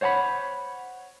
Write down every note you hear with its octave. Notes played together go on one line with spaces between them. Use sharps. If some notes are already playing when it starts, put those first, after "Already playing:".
C5 C#5 F#5 A5 B5